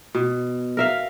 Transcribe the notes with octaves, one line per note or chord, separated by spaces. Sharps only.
B2
A#4 E5 F5